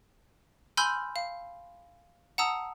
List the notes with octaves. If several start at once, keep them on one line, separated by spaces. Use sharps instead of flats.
G#5 B5 C6 E6 F6 G6
F5
F#5 A5 A#5 D#6 E6